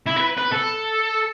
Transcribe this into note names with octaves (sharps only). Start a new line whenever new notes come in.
E4
B4
B4
A4